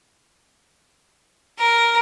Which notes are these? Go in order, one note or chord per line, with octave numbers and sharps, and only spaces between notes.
A#4